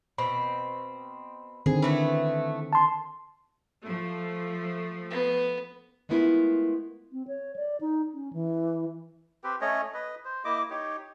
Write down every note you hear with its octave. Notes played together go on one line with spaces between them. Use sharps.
B2 C4 B5
D3 D#3 C4 G#4
E3 A3 B3
A5 C6
F3 A3
B3
G#3 A3 B3 E4 F4 A#4
C4
C#5
D5
D#4
C#4
E3
C4 G4 B4
A3 C#4 C#5 D#5
B4 D#5
C5
A#3 E4 D#5 D6
D#4 G4 C#5